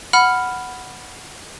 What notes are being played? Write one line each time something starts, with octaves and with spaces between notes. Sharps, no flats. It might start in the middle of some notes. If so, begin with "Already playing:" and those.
F#5 B5 F6